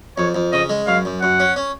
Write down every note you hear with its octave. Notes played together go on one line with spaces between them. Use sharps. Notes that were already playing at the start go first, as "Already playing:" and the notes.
F2 C#5
F2
C#3 D#5
G#3
F#2 F5
F#2
F#2 F#5
C#4
C#4